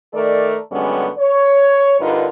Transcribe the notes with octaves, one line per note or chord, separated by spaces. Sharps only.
D#3 A3 A4 A#4 D5
F#2 D3 G3 G#3 B3 C#4
C#5
G2 D3 D#4 F4 A#4 B4